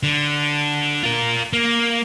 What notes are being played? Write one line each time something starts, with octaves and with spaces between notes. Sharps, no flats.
D3
F4 A#4
A#3